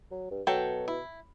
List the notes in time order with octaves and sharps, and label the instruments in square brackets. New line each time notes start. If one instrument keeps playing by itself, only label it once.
[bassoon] F#3
G2
[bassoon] B2 [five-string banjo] F#3 A4 G5
[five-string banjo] E4